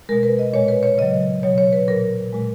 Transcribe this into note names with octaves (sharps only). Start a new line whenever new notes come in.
B2 G#3 A#4
B4
D#5
A#2 G#3 C#5
B4
C#5
C#3 F#3 D#5
B2 F#3 C#5
C#5
B4
A#2 F#3 A#4
A#2 G#3